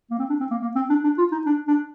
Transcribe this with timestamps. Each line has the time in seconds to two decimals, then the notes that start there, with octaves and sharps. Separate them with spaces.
0.11 A#3
0.19 C4
0.29 D4
0.40 C4
0.51 A#3
0.62 A#3
0.76 C4
0.90 D4
1.04 D4
1.18 F4
1.32 D#4
1.46 D4
1.68 D4